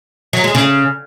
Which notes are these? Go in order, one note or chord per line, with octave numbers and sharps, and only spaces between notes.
F#3
G#3
C#3